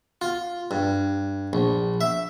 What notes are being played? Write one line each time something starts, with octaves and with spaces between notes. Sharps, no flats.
F4
G2
A#1
E5